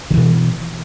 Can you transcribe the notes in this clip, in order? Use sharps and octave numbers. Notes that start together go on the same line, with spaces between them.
B2 D#3 E3